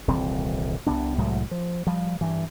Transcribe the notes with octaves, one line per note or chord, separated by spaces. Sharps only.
D#1 C2 E3 C4
C2 C3 B3 D4
C2 A2 F#3 G#3
F3
F3 G3
G2 E3